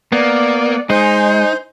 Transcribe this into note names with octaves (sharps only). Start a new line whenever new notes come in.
A#3 B3 D5
G#3 D#4 C5 G#5